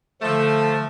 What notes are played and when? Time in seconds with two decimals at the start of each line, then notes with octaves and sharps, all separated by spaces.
0.22 D3 F3 A3 A5